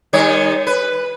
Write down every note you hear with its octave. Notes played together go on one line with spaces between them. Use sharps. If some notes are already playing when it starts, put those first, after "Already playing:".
D#3 G3 C#5
B4